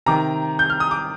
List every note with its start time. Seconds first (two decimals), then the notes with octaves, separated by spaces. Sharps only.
0.06 C3 D#3 A#5 D6
0.59 G6
0.70 F6
0.80 D#6
0.91 D6